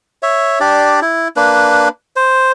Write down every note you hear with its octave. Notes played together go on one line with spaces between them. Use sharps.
C#5 E5
D4 G4 D5
E4
A#3 D4 B4
C5